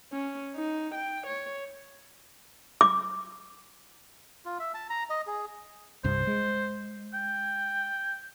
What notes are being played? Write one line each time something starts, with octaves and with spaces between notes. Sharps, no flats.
C#4
D#4
G5
C#5
D6
F4
E5
A5
A#5
D#5
G#4
C2 G2 C5
G#3
G5